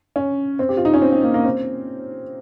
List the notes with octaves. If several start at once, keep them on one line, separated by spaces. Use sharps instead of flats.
C#4
C4
G4
F4
D#4
C#4
C4
C4
A#3
A#3
C4